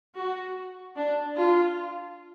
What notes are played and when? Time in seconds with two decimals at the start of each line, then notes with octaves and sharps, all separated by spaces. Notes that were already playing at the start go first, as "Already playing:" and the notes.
0.18 F#4
0.96 D4
1.36 F4